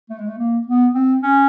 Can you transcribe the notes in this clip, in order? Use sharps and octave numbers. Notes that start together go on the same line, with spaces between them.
A3
G#3
A3
A#3
B3
C4
C#4